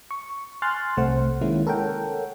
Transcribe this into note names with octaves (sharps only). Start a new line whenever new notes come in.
C#6
G#5 C6 F6 F#6 A6
C2 C3 A3 C5 F#5
D#3 G#3 A#3 C#4 E4
A4 A#4 C#5 F#5 G5